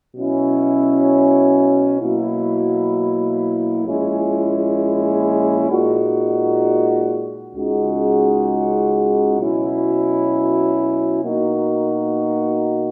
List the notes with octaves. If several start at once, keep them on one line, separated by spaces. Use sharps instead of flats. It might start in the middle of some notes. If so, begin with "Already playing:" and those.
B2 F#3 C#4 E4
B2 F#3 A#3 E4
A#1 A#2 G#3 C#4 E4
A#2 G#3 D#4 F#4
C#2 C#3 G#3 D#4 F#4
B2 F#3 C#4 E4
B2 A#3 D#4 F#4